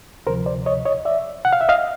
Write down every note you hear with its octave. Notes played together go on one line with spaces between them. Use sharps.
D2 C3 F3 A#4 C5
C5 D5
C#5 D#5
C#5 D#5
D5 E5
F#5
F5
E5
D#5 F5